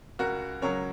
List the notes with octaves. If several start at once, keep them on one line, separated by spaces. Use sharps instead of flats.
C#2 F#4 A#4
C#3 F#3 A#4 C#5